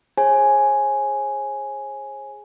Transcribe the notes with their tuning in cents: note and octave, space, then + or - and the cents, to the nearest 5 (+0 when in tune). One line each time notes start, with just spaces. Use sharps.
G#4 +5 C#5 -45 G#5 +5